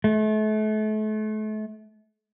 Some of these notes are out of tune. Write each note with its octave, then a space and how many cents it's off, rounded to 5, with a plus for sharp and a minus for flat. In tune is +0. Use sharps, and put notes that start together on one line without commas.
A3 -35